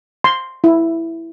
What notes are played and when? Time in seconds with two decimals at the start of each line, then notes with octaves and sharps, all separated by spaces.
0.24 C6
0.64 E4